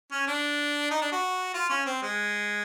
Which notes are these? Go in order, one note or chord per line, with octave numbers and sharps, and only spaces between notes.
C#4
D4
D#4
D4
F#4
F4
C#4
C4
G#3